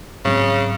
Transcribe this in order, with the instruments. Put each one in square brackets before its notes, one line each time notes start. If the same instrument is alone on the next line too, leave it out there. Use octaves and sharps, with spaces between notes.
[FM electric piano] G#2 F#3 C4 [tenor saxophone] C#3